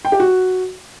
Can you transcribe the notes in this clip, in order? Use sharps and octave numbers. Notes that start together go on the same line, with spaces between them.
G5
G4
F#4